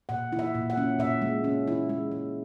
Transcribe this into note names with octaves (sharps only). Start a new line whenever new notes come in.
A#2 F#5
E4
E5
A#2
F#5
C#4
A#2 E5
G#3
C#4
E4
G#3
G#3